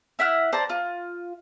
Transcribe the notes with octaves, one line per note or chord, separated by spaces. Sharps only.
E4 E5 F#5 F6
C5 D5 A5 A#5
F4